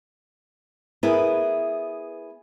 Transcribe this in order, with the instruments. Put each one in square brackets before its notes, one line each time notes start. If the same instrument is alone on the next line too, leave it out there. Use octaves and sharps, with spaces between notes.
[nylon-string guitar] B3 E4 G#4 A#4 B4